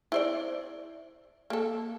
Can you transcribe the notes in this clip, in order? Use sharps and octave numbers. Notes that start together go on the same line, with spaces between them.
E4 C5 D5
A#3 A4